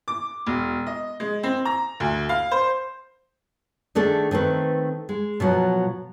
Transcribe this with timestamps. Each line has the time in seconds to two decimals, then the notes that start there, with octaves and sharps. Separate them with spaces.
0.08 D6
0.47 E1
0.87 D#5
1.20 G#3
1.43 C4
1.65 A#5
2.00 D2
2.29 F5
2.51 C5
3.95 D#3 A3 D4 G#4 A4
4.31 D#3 A3 C4 B4
5.09 G#3
5.40 B2 F3 F#3